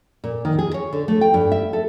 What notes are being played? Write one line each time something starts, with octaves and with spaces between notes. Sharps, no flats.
A#2
D#3
G#4
C#5
D3
A3
G5
G2
E5
A4